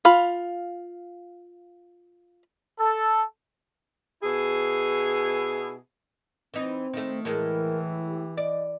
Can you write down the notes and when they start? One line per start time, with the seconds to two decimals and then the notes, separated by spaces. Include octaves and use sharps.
0.05 F4 F5 B5
2.80 A4
4.23 B2 E4 G#4
6.54 E3 C4 D#4
6.93 D#3 A3
7.25 A2 E3 G#3 A#4
8.07 G4
8.37 D5 D#5